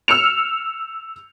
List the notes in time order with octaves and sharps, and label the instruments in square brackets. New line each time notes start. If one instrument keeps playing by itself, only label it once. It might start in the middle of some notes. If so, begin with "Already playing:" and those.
[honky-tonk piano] E6 F6 C#7 F7